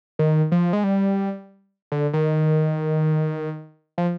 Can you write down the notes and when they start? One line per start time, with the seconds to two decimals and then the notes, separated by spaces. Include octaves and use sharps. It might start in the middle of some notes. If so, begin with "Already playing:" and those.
0.19 D#3
0.52 F3
0.73 G#3
0.84 G3
1.92 D3
2.13 D#3
3.98 F3